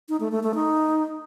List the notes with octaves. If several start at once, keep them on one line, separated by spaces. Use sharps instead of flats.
D#4
A3
A3
A3
D#4